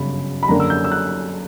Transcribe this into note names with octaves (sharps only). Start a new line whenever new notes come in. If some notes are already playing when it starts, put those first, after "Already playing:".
Already playing: G1 F#2 C#3 B5
B5
F#2 D3 A#3 C#4 A#5
E6
G6
E6
F#6